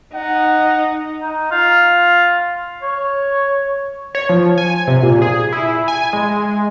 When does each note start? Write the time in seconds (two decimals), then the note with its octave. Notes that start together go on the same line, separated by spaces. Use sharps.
0.14 D#4 F#5
1.22 D#4
1.51 F4
2.83 C#5
4.15 C#5
4.29 F3
4.58 G#5
4.87 C3
5.02 A#2
5.22 G#4
5.52 E4
5.88 G#5
6.13 G#3